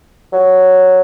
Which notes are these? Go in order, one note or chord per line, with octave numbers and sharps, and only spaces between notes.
F#3